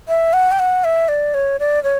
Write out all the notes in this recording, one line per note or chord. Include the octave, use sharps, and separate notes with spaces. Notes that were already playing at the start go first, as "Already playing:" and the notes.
E5
F#5
G5
F#5
E5
D5
C#5
D5
C#5